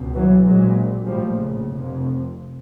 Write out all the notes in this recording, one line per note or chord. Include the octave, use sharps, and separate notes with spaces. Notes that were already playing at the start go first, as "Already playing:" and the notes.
Already playing: C#2 B2
E3 F#3
A#1 A#2 F#3 G#3
A#1 A2 F3 G3
C#3
F1 F2 C3